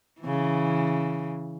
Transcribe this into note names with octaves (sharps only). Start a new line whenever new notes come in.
C#3 E3